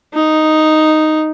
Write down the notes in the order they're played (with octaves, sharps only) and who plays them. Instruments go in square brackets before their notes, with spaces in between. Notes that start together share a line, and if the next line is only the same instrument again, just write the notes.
[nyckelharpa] D#4